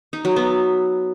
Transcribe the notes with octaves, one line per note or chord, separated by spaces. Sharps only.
D#4
F#3
B3